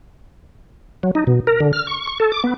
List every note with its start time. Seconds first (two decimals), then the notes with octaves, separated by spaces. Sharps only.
1.03 F#3
1.15 D#4
1.27 B2
1.47 A#4
1.60 D3
1.73 F6
1.87 C#6
2.07 C#6
2.20 A4
2.32 D6
2.44 B3